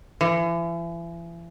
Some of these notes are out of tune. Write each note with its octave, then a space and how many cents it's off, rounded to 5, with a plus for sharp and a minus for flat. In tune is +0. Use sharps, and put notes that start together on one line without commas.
E3 +40